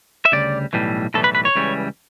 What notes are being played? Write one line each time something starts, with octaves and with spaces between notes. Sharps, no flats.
E5
D2 C#3 G3 D5
B1 A2 E3 G3
B1 A2 E3 G3 A4
B4
B4
C#5
C#2 C#3 E3 G3